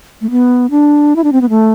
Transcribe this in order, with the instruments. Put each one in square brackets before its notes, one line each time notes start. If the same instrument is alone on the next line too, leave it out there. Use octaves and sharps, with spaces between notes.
[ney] A3
B3
D4
E4
D4
C4
B3
A3